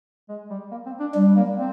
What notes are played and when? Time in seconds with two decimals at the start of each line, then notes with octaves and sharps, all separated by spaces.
0.29 G#3
0.50 G3
0.71 A#3
0.86 C4
1.00 D4
1.14 G3 D4
1.36 A#3
1.58 C4